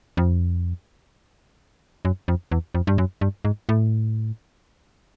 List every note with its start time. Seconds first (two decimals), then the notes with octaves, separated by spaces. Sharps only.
0.17 F2
2.05 F#2
2.28 F2
2.52 E2
2.75 F2
2.87 G2
2.98 F#2
3.21 G2
3.45 G#2
3.69 A2